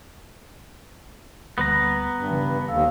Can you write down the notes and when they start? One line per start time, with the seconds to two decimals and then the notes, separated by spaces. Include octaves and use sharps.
1.58 D2 G3 A#3 B3 B4 A#5
2.17 G2
2.31 C#3 E3
2.68 D#2 A4 F5 E6